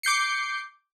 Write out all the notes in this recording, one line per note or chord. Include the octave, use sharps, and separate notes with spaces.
D6 G6 C7 C#7